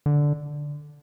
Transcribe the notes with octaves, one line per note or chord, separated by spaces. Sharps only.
D3